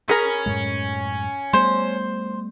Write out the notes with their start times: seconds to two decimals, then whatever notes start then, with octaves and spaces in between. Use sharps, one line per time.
0.09 C#4 G#4 A#4 B5
0.46 F#2 A2 G#3
1.53 G3 A3 B3 C5